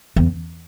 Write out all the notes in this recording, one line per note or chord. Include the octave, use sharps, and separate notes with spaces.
E2